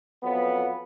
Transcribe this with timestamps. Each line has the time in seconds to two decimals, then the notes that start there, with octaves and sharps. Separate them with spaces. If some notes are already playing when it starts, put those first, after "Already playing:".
0.23 F2 F#3 B3